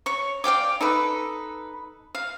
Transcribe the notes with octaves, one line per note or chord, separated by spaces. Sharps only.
C#5 C#6
D5 F5 G5 D6
D#4 A4 B4
F5